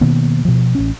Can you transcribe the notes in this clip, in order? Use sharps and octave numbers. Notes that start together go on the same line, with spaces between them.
B2 D#3 A#3 B3
B2 F3
A1 C#4